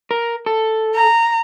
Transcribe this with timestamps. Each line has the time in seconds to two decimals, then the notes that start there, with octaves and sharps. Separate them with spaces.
0.11 A#4
0.46 A4
0.95 A#5